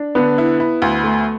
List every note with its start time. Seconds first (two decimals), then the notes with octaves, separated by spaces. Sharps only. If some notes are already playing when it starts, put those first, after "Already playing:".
Already playing: D4
0.15 D3 B3
0.38 E4
0.60 E4
0.82 D2
1.04 A3